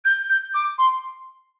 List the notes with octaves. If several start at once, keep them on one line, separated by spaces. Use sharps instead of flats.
G6
G6
D6
C6